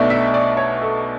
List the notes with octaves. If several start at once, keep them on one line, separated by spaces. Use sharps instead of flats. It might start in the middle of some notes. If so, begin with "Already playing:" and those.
Already playing: B1 B2 A3 D4
E5
D5
C#5
A4